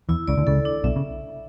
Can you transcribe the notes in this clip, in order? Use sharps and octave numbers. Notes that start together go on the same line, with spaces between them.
E2 E3 E4
C#2 C#3 D5
D2 D3
C#2 C#3 A4
D4
B1 B2 E5
C#3